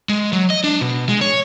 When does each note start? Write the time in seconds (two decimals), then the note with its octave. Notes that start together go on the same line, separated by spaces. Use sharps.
0.09 G#3
0.33 F#3
0.50 D#5
0.64 D4
0.81 B2
1.09 G#3
1.21 C#5